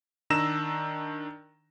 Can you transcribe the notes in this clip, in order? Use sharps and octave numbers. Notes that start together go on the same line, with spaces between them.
D#3 D4 A#5 E6 A#6 E7